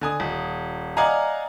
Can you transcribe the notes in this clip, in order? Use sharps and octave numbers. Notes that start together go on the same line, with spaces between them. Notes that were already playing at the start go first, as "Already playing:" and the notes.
D3 G#5 D#6
D#1
D5 D#5 F5 F#5 G#5 A#5